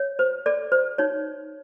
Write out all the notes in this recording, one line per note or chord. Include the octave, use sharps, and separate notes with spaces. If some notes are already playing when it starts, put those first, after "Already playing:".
Already playing: C#5
C5
A4 D5
C5
D#4 C#5